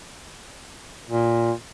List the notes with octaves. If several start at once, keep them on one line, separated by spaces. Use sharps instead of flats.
A#2